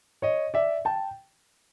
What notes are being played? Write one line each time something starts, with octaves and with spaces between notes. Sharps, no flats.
C#5 D#5
D5 E5
G5 A5